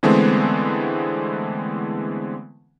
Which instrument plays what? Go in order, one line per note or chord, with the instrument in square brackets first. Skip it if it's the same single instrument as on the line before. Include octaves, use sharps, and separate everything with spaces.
[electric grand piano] D3 E3 G#3 A3 B3 C4